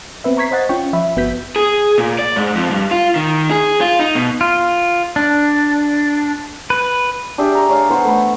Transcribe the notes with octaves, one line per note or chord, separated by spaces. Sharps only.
B3 C4 B4 E5
A#5 C#6 G#6 B6 C7
C5 D#5 F#5 A6
C#4 F4 G5 C#6
F3 E5 B5
G1 B3 F#4 G6 B6
G#4
A#2
D5
G#2
F2
G2
F4
D#3
G#4
F4
D#4
B2
F4
D4
B4
D4 G4 G#4 E5
A#5 C#6
G#4 C#5 D5 F5
E3 B3 C5 F#5
A3 B4